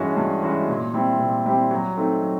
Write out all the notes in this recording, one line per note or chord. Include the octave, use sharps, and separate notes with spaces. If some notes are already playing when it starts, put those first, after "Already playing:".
Already playing: G2 E3 G#3 C#4 F#4
G2
E3 G#3 C#4 F#4
A#2
G3 C4 E4 G4
A#2
G3 C4 E4 G4
F#3
A3 C4 D#4
F#3